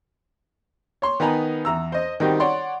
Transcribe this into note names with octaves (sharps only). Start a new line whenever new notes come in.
C#5 C6 C#6
D#3 B3 D#4 G#5 A#5 B5
E2 A#5 E6
C5 D#5
D#3 G3 C4 D#4 F#4 G4
C#5 D5 F#5 C6